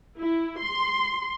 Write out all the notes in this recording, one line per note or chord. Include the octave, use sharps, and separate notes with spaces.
E4
C6